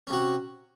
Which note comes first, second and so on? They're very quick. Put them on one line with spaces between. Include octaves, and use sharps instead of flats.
C#4 C3 F#4